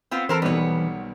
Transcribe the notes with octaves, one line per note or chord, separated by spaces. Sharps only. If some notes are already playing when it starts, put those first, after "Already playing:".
B3 C4 F4
E3 C4 A4 A#4 C5
B1 D#3 G3 B3 C#5